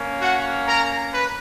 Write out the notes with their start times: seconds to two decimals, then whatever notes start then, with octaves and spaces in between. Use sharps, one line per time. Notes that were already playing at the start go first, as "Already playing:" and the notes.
Already playing: A#3 C#4
0.21 F#4 F#5
0.66 A#4 A#5
1.11 B4